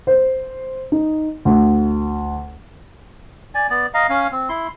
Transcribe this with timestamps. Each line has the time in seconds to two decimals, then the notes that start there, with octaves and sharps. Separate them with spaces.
0.07 C5
0.92 D#4
1.45 D2
3.55 D5 G#5
3.70 B3 D5
3.94 D#5 F5 A#5
4.10 C#4 F5
4.32 C4
4.49 E4 C6